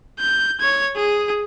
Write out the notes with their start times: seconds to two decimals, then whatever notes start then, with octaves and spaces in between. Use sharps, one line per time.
0.20 G6
0.60 C#5 G#6
0.96 G#4